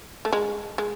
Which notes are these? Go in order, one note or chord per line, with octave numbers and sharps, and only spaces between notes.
A3
G#3
G#3